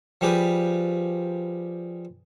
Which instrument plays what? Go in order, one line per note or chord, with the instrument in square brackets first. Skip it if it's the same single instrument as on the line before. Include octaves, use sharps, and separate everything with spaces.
[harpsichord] F3 G3 G4 G#4 B4